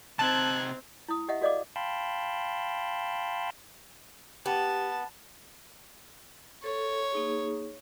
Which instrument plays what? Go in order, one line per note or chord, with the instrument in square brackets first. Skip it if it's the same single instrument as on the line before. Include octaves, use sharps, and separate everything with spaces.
[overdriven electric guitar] C3 D#4 [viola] C4 [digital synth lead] A5 [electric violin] F#6 G#6
[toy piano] E4 D#6
G4 D#5 E5 F#5
F#4 A4 D5 D#5 F5 D6
[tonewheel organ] F5 G5 A5 B5 C6
[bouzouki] B3 [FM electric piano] G4 [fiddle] A5
[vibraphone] A4 [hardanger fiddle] C#5
[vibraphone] A#3 D#4 G#4